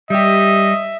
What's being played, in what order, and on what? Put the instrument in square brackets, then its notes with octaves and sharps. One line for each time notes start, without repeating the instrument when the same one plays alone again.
[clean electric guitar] G3 G4 [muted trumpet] D#5 [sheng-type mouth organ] E5